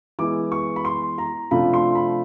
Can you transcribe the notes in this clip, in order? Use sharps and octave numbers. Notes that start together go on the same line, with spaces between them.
E3 G#3 B3 E4 D6
C#6
B5
C6
A#5
C3 F3 A3 D4 F4 B5
C6
B5